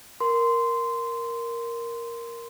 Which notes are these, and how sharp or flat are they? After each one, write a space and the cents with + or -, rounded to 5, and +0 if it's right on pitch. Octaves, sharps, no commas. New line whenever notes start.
A#4 +5 C6 -15